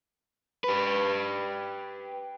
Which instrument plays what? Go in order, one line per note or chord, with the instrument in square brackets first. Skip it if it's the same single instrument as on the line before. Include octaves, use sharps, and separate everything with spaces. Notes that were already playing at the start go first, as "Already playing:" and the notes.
[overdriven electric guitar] G4 B4